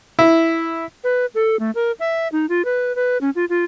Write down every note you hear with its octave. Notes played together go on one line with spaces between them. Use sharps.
E4
B4
A4
A3
A#4
E5
D#4
F4
B4
B4
C#4
F4
F4